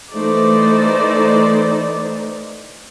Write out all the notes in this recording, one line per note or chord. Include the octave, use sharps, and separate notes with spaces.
E3 A3 D#4 C5 D5